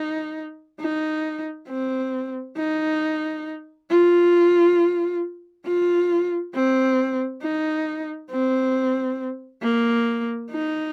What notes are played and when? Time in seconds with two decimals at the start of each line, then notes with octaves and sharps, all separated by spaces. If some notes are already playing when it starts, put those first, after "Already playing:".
Already playing: D#4
0.80 D#4
1.69 C4
2.57 D#4
3.90 F4
5.66 F4
6.55 C4
7.42 D#4
8.30 C4
9.63 A#3
10.51 D#4